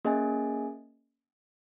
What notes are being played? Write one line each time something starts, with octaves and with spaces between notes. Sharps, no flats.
A#3 C#4 G#4 D#5 G#5